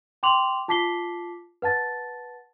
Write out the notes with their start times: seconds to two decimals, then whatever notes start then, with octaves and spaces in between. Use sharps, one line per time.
0.23 G5 C6 D6 F7 F#7
0.68 F4 A5 D6 B6 C7 G7
1.62 B4 F#5 A5 A6